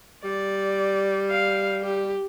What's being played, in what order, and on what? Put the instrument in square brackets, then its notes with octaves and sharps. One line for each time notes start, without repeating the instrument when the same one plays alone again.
[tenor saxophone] G3 [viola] D5
[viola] F5
G4